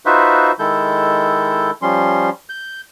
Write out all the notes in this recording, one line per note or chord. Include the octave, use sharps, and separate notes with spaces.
D#4 F4 F#4 B4 C5 E5
D#3 G#3 E4 A4 G6
F3 G3 C#4 C6
G6